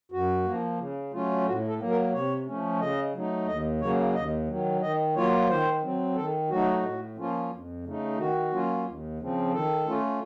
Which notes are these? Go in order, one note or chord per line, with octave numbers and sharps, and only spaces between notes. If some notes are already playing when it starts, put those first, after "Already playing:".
F#2 F#4
F3 A#3
C#3
F#3 A3 C#4 F4
A2 F#4
A4
F#3 A#3
A#4
C3 C#5
F3 A3 C#4
C#3 D#5
F#3 A3 D#4
D#2 D#5
C#3 F#3 A#3 C#5
D#2 D#5
D#3 F#3
D#3 D#5
F#3 A#3 F4 C#5
D#3 C5
F#3 C4
D#3 A4
F#3 A3 D#4 F#4
A2
F3 A#3 C#4 F4
F2
C#3 A3 D#4
D#3 F#4
F#3 A#3 C#4 F4
D#2
C#3 F3 C4
D#3 A4
A3 C#4 F4